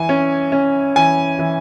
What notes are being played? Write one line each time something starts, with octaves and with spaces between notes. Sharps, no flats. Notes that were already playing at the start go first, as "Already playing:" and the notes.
Already playing: E3 G#5
C#4
C#4
E3 G#5
E3